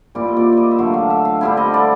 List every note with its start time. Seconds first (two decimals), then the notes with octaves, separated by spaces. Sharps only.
0.15 A#2 G3 C4 E4 D5
0.28 D#5
0.37 D5
0.52 D5 D#5
0.71 E5
0.78 D3 F#3 A3 F5
0.94 F5
1.10 E5
1.25 F5
1.41 D3 G3 C4 E4 E5
1.57 D#5
1.74 D5